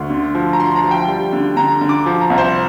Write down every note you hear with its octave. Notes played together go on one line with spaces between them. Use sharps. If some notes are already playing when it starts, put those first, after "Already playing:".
Already playing: D2 C6
D3
F3
A#5
F3 C6
A#5
F3
G5
G3
D3
D3 A#5
D3
D6
F3
A#5
C2
C5